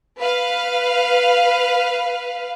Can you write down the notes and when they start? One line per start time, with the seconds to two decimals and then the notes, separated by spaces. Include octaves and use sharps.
0.20 B4 F5